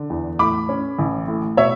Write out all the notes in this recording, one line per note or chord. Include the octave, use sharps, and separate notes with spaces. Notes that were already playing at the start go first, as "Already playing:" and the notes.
Already playing: D3
E2
A2 B5 D6
C#4
A1
A2
B2 C#5 E5